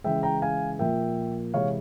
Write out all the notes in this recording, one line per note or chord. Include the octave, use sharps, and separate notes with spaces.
C#3 E3 G#3 E5 G5
G5 A#5
F5 G#5
A#2 F3 A#3 E5 G5
C3 E3 G#3 C#5 F5